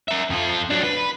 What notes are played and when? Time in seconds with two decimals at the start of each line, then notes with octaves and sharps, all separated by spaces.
0.08 A#4 E5
0.30 F2 F4
0.70 F#3 D4
0.84 B4